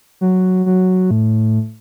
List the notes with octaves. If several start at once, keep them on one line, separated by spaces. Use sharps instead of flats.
F#3
F#3
A2